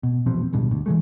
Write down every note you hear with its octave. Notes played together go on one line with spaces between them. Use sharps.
B2
E1 A#1 B2 C4
D1 G#1 G2 B2
D2
E3 F3 G#3 A3